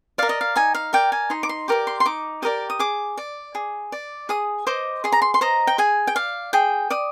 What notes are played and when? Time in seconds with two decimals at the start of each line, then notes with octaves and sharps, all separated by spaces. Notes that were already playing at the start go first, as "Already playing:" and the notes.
0.18 A#4 D5 F5
0.29 D#5
0.41 F5
0.56 D#4 G#5
0.75 F5
0.93 A#4 D5 G5
1.12 G#5
1.30 D#4 C6
1.43 D6
1.49 C6
1.68 G4 A#4 D5 D6
1.87 C6
2.00 C6
2.05 D#4 D6
2.42 G4 A#4 D5 D#6
2.70 D#6
2.79 G#4 D6
3.17 D5
3.55 G#4
3.92 D5
4.29 G#4 D#6
4.67 C5 D#5 D6
5.04 G#4 C6
5.12 A#5
5.22 C6
5.34 C6
5.41 C5 D#5 A#5
5.67 G5
5.78 G#4 G#5
6.07 G5
6.16 D5 F5
6.53 G#4 G5
6.90 D5 D#6